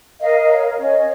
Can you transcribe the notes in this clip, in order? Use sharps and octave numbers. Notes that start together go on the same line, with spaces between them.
A#4 D#5 F5
C#5
C#4 C#5 D#5